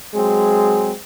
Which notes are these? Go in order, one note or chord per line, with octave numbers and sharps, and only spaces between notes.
F#3 G#3 C4 G#4